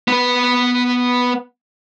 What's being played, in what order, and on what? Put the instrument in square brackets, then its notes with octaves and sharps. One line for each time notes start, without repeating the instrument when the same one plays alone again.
[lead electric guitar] B3 B4